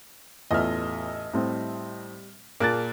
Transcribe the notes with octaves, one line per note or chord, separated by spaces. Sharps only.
A1 E2 F4 A4 D#5 E5 F6
A2 G3 C4
A#2 A#3 G#4 A#4 A5 F#6 A6